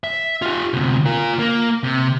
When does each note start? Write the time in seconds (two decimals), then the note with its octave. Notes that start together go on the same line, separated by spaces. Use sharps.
0.04 E5
0.42 F4 G4
0.73 D2 C3
1.06 F4 A#4
1.39 A#3
1.84 C3